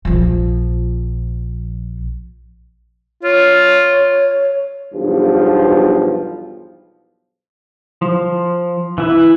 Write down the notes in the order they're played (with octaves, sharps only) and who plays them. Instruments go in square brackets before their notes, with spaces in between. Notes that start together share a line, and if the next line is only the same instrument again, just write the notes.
[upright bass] A#1 F3
[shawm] F4 [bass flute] C#5
[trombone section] B1 E2 G2 F3
[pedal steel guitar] F3
E3 E4 B4